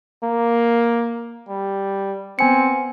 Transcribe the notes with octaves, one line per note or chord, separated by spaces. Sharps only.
A#3
G3
B3 C4 G#5 C#7